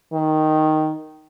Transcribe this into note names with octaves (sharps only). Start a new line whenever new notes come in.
D#3